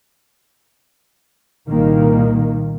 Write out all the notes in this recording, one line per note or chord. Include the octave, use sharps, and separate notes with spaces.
C2 A#2 D#3 A#3